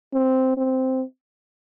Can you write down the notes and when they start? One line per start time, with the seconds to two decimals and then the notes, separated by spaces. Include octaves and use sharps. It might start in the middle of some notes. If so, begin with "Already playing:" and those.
0.14 C4
0.57 C4